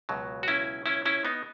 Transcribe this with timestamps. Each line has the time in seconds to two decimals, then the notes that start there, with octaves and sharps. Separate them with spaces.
0.09 C#2 B2 F#3
0.43 F#4
0.48 C#4 E4
0.86 C#4 E4
1.06 C#4 E4
1.25 B3 D#4